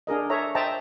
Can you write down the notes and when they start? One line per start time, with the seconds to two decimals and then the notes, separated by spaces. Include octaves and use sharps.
0.07 D4 G#4 A#4 D#5
0.30 A4 C#5 E5 A#5
0.55 C5 D#5 E5 G5 A5 A#5